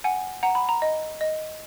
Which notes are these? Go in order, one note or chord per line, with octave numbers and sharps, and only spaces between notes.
F#5 G#5
F#5 A#5
B5
A#5
D#5
D#5